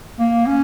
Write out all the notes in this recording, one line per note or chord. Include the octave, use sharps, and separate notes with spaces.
A#3
C#4